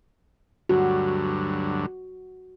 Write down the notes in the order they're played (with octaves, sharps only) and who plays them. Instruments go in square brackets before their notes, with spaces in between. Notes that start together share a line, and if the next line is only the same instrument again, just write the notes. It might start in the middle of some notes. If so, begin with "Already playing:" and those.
[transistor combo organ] D2 G2 F#3 [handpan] F#4